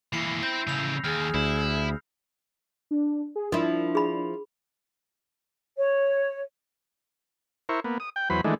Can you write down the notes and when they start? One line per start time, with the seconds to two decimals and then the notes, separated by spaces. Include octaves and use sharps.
0.13 E3 A#3 E4 C7 C#7
0.43 C4 C5 B5 G6 A#6
0.67 A2 C#3 E6 G6 F7
1.04 D#2 G#4 F6
1.34 D2 E4
2.91 D4
3.36 G#4
3.52 F3 D4 E4 A#4
3.95 G#4 B5
5.78 C#5
7.69 E4 A#4 C5 C#6
7.84 A#3 B3
8.00 D#6
8.16 G5
8.30 E2 F#3 B4 C5 B5
8.44 D#3 E3 G#3 A3 D4